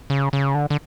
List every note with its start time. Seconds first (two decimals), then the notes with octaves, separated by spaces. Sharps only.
0.10 C#3
0.33 C#3
0.55 D3
0.70 D3